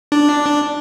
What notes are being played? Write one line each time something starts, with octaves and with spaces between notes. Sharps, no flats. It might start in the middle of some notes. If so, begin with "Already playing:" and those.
D4